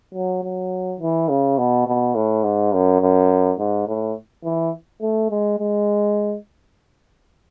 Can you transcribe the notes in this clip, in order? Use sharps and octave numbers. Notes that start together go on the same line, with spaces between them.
F#3
F#3
E3
C#3
B2
B2
A2
G#2
F#2
F#2
G#2
A2
E3
A3
G#3
G#3